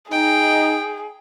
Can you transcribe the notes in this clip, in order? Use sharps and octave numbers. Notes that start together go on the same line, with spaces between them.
D#4 G#4 G5